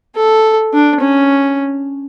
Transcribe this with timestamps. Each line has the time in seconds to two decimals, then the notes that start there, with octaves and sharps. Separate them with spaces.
0.16 A4
0.73 D4
1.00 C#4